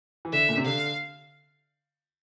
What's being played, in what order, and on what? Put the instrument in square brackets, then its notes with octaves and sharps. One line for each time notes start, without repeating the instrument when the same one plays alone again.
[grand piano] E3
[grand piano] D3 [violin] E5
[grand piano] A#2
C3
[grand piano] D3 [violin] F5